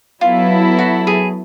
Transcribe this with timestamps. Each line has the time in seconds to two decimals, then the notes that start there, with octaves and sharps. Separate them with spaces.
0.21 F#3 B3 E4 F4 A4
0.79 F#4
1.07 G#4